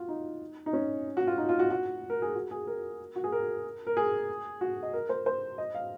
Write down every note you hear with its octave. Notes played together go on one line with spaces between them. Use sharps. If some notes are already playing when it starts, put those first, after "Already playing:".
Already playing: F4 F#4
D#4
D#4
C#4
F#4
F4
D#4
F4
F#4
F#4
A#4
G#4
F#4
G#4
A#4
F#4
G#4
A#4
A#4
G#4
F#4
D#5
A#4
C5
C5
D#5
F5